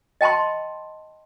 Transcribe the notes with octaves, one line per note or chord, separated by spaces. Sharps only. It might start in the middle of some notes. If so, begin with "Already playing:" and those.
D#5 G5 A5 B5 C6